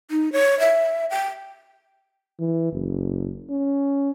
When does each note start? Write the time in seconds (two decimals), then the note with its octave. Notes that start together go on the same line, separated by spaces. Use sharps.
0.11 D#4
0.32 C#5
0.60 E5
1.10 G5
2.39 E3
2.73 F#1
3.50 C#4